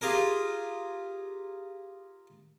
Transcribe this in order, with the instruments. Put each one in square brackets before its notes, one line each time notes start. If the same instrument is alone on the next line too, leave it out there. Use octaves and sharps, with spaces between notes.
[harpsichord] F4 G4 G#4 A#4